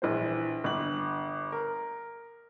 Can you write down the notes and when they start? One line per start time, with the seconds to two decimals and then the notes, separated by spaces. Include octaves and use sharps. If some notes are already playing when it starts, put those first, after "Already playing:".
0.02 A#1 E3 C5
0.64 G1 F#7
1.52 A#4